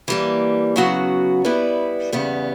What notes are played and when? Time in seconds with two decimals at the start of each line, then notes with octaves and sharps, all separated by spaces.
0.08 E3 G3 A#3
0.76 C#3 F#3 B3 F#4
1.45 G3 B3 E4 B4 D5
2.13 E2 C#3 G3 B3